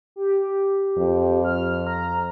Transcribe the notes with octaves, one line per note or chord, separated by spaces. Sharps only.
G4
F2
F6
A#5